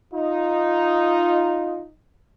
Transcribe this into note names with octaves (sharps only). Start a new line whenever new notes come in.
D#4 F4